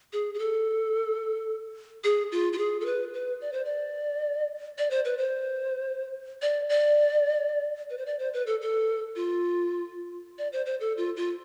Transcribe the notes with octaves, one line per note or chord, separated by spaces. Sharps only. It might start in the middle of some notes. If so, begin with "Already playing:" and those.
G#4
G#4
A4
G#4
F4
F4
G#4
A4
B4
B4
D5
C5
D5
D5
C5
B4
C5
D5
D5
B4
C5
D5
C5
B4
A4
A4
F4
D5
C5
C5
A4
F4
F4